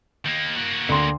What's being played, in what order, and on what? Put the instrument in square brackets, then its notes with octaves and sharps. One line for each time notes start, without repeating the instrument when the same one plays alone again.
[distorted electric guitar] D#3 A#3
A#3 F#4
[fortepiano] D2 D3 C6